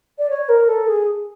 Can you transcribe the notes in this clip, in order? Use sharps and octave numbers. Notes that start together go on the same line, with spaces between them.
D5
C#5
A#4
A4
G#4